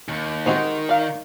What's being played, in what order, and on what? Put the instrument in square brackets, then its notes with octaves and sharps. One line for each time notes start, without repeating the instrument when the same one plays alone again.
[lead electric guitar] D#2
[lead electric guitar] D#3 [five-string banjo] G#3 F#4 G4 [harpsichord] C4 D#4 C5
[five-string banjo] D5 F5